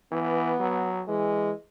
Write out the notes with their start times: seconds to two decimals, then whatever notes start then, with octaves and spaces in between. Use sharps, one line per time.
0.12 E3 B3
0.60 F#3
1.08 E3 G#3